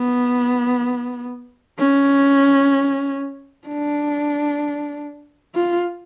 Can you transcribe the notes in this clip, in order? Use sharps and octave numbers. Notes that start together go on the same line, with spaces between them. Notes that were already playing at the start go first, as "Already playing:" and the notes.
Already playing: B3
C#4
D4
F4